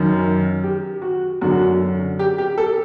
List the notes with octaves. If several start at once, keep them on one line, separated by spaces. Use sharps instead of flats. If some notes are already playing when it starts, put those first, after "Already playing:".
Already playing: F#2 D#3
G4
F#4
F#2 D3 F#4
G4
G4
A4